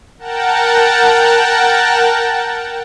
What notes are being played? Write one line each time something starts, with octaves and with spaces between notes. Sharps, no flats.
A#4 F#5 G5 A5 A#5